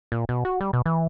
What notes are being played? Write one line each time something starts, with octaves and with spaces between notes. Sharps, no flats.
A#2
B2
F#4
G3
B2
E3